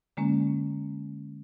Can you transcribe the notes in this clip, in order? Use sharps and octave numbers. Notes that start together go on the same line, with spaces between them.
D3 G#3 A#3 C#4